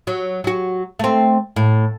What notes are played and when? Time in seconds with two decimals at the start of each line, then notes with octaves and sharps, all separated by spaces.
0.07 F#3
0.44 F#3 F#4
0.99 A3 C4
1.56 A2